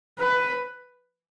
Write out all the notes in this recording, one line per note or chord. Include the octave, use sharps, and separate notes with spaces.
B4